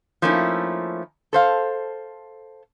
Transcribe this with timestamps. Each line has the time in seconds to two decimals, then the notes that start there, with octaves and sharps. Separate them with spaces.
0.22 F3 A3 A#3 C#4 D#4 E4
1.33 A4 C5 F5